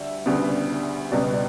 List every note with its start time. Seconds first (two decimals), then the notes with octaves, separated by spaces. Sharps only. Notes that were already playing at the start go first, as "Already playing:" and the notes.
Already playing: D2 G3 E5
0.26 D2 C#3 G3 B3
1.12 C#2 B2 G3 B3 D5
1.33 D5